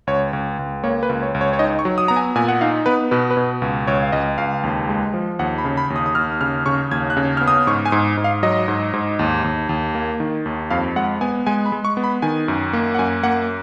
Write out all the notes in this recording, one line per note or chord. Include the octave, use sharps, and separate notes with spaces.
C#2 C#5
C#2
C#2
A#3 C#5
B4
C#2
C#5
C#2
C#5
C#5
D#4 D#5
C#6
F#3
D#6
B3 A#5
G#5
A#2 G#5
F#5
D#4 F5
B3 B4
B2 B4
B4
B2
C#2
C#2 C#5
F5
C#2 D#5
C#2 F5
D#2
G#3
F3
D#2 F#5
B5
C#3
B5
D#2
D#6
D#6
D#2 F6
C#3 F6
C#3 C#6
D#2 G#6
F#6
C#3
B3 F6
D#6
G#2 C#6
G#5
G#2
G#2
F5
F#3 D#5
G#2
G#2
D#2
D#2
D#2
A#3
D#3
D#2
F2 F5
G#3 F#5
B3 G#5
G#3 G#5
B5
G#3
C#6
B3
B5
D#3 G#5
F#2
A#3
F#5
F#2 G#5
A#3 F#5